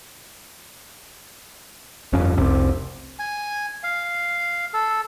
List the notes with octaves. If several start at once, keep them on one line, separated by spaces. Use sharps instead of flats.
G1 F2 C#4
F1 C2 C3
G#5
F5
A4